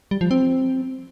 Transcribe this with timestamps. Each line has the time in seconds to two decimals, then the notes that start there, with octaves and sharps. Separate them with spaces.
0.11 G3
0.21 F3
0.31 C4